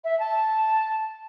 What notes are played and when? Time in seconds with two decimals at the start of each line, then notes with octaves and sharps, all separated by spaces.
0.04 E5
0.19 A5